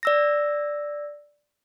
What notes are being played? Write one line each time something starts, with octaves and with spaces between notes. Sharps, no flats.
D5 E6 A#6